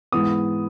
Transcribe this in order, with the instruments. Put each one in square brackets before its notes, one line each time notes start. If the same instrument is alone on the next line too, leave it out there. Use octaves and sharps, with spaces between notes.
[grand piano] G#2 E3 B3 D#6